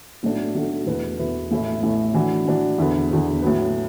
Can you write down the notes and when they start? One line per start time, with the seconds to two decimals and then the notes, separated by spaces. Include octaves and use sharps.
0.23 B1 A2 A3 D4 F#4
0.55 B1 A2 A3 D4 F#4
0.86 E2 B2 A3 E4 B4
1.19 E2 B2 A3 E4 B4
1.51 A1 A2 A3 E4
1.82 A1 A2 A3 E4
2.14 A2 E3 D4 F#4
2.46 A2 E3 D4 F#4
2.78 E2 D3 B3
3.10 E2 D3 B3
3.42 A2 F#3 B3